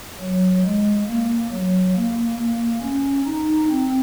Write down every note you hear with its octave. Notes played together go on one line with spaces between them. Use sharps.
F#3
G#3
A#3
F#3
A#3
A#3
C#4
D#4
C4